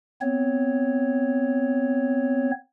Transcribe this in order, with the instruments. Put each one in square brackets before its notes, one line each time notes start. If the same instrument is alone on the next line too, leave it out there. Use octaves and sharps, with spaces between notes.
[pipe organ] B3 C4 C#5